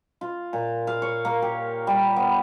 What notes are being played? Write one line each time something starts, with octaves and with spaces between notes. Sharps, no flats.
F4
A#2
F5
C#5
A#3
G4
G3
B3